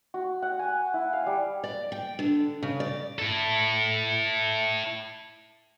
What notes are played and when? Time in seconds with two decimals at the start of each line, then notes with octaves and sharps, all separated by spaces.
0.14 F#4
0.42 F#5
0.59 G#5
0.94 E4
1.13 F5
1.26 G3
1.64 D5
1.92 G5
2.19 D3
2.63 C#3
2.80 D5
3.18 E4 A4